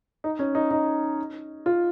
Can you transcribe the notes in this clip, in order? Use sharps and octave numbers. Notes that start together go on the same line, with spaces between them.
D#4
C#4
D#4
D#4
F4